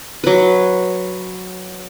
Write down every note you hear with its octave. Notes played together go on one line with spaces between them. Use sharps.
F#3 B4